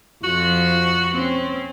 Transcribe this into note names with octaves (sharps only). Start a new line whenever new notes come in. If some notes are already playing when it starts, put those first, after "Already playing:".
F2 F3 F#4
C4 C#4